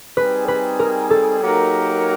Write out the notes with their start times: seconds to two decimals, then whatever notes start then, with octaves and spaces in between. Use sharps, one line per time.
0.17 G3 C4 D#4 G#4 B4
0.48 B4
0.79 A#4
1.10 A4
1.42 F#3 A#3 D#4 G4 A#4